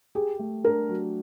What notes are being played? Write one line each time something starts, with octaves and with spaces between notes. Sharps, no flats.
G4 G#4
A3
D4 A#4
F#3